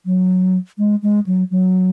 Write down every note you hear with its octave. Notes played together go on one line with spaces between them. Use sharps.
F#3
G#3
G#3
F#3
F#3